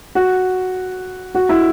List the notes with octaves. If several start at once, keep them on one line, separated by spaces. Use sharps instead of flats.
F#4
F#4
E4